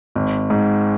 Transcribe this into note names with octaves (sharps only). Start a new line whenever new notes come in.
G#1
G#2